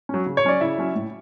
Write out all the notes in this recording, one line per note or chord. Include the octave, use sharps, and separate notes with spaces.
F#3 C#4
C#3
C#5
F#3 C#4 D5
C#3 E4 E5
F#3 C#4
A2